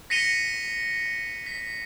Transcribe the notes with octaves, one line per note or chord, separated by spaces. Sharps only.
A#6 B6 C#7 D#7 F7 G7
B6